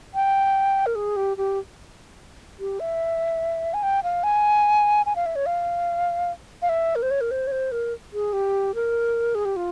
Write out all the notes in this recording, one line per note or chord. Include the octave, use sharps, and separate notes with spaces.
G5
A#4
G#4
G4
G4
G4
E5
G#5
G5
F5
G#5
G#5
F5
E5
C#5
F5
F5
E5
A#4
C5
C#5
A#4
C5
C#5
C5
A#4
G#4
G4
A#4
G#4
G4
F4